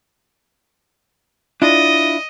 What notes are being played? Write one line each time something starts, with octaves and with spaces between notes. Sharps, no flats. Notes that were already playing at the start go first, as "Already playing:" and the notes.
D4 E4 F4 D#5